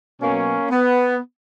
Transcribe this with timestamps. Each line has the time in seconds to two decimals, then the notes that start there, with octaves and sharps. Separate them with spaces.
0.21 B2 F#3 A#3 C#4
0.71 B3